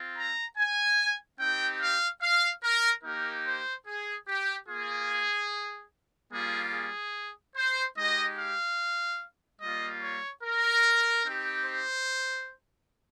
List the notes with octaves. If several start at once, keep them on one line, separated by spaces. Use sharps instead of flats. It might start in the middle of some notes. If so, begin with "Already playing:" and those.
Already playing: C4 F4
A#5
G#5
C4 D#4 G4 G5
F5
F5
A#4
A#3 D#4 G4 A#4
C5
G#4
G4
A#3 F4 G#4
G3 A#3 F4 G#4
G#4
C5
G#3 D#4 G4 D#5
F5
G3 A#3 F4 D#5
C#5
A#4
C4 D#4 G4
C5